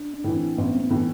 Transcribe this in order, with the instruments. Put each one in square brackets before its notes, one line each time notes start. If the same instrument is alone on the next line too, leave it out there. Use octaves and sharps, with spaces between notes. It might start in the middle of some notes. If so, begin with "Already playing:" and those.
Already playing: [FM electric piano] D4
D4
[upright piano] A2 E3
[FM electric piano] C4
[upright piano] A1 [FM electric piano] B3
[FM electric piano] C4
B3
[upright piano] A2 E3